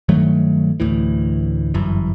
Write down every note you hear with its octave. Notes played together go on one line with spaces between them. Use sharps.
G2 D#3 F#3 A3
D2 A2 E3
G1 F#2 E3